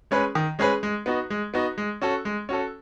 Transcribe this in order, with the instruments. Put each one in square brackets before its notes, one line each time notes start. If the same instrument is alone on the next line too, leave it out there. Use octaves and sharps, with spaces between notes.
[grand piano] G#3 C#4 G#4 B4
D#3
G#3 C#4 G#4 B4
G#3
B3 D#4 F#4
G#3
B3 D#4 F#4
G#3
C#4 F#4 A4
G#3
C#4 F#4 A4